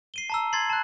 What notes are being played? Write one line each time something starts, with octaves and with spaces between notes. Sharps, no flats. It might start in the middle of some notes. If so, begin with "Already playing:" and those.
C7 D#7 G7
A5 A#5 E6
C6 G#6 A6 C7 F#7
A5 F#6